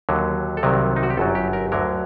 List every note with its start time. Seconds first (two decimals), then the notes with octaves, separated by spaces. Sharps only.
0.09 D#2 D3 F#3
0.57 A4
0.63 C2 C3 D#3 F#3 A#4
0.96 D#4
1.03 F#4
1.10 G4
1.17 G1 F#2 F#3 A4
1.35 G4
1.53 A#4
1.72 D2 D3 F#3 A#4